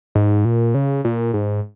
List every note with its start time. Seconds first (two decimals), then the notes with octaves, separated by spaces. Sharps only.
0.15 G#2
0.45 A#2
0.74 C#3
1.05 A#2
1.34 G#2